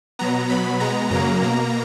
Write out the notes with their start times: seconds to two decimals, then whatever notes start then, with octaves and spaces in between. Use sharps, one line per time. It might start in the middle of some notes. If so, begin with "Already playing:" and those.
0.19 B2 F#3 B3 A#5
0.49 B2 F#3 B3 B5
0.80 B2 G#3 B3 A#5
1.10 F#2 C#3 F#3 A#3 A#5
1.42 B2 A#3